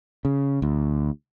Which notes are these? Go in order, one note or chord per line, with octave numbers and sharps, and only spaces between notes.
C#3
D2